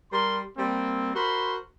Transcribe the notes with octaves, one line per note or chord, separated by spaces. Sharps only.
G3 A#4 C6
G3 A#3 C4
F#4 A#4 C5 B5 C6